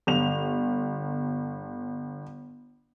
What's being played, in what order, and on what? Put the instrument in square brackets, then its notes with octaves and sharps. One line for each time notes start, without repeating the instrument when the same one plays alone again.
[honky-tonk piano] G1 F7